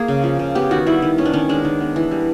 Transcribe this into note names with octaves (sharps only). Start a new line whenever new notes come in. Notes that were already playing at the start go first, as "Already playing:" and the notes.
Already playing: A#3 G#4
C#3
F3
C#3
B3 G4
D#3 F#4
G3 E4
D#3
B3 C#4
D4
D#3 C#4
G#3 D4
D#3
B3
E3
G3